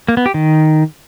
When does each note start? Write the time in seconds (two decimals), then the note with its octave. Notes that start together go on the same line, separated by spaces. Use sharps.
0.08 A#3
0.17 B3
0.26 G4
0.34 D#3